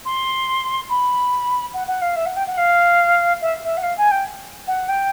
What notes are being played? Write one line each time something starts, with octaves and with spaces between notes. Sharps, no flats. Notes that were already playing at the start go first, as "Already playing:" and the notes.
C6
B5
F#5
F#5
F5
E5
F#5
G5
F#5
F5
E5
E5
F#5
F5
G#5
G5
F#5
G5